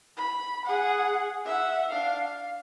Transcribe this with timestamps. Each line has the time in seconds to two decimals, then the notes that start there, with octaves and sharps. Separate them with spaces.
0.17 B5
0.65 G#4 F#5
1.45 E5 F#5
1.91 D4 F5
2.25 F5